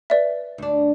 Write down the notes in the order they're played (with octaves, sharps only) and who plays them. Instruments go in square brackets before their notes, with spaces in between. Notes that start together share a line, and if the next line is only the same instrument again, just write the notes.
[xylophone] B4 D5 E5
[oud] D2 D4